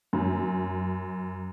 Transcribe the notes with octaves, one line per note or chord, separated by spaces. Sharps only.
F#2